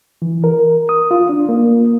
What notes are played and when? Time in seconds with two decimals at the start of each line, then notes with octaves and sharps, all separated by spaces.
0.22 E3
0.44 A#4
0.89 D#6
1.11 F4
1.29 D4
1.49 A#3